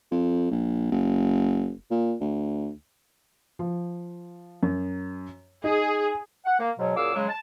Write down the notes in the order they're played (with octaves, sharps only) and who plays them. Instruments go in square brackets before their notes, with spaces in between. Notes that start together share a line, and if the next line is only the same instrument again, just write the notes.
[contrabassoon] F2
A#1
F#1
A#2
D2
[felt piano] F3
F#2
[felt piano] D#4 [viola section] G#4
[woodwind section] F#5
A#3
G#2 B2 F#3
F#2 A#2 G#4 F5 D6 E6
C#3 F#3 G#3
A5